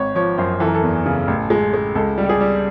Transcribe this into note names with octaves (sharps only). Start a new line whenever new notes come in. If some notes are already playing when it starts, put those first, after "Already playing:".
Already playing: G#1 C#5
F3 C#5
F#2 C5
E3 A4
A#4
A4
E2
C#3
A1
G#3
G#3
C#2 A4
G3
G4
G#4
G3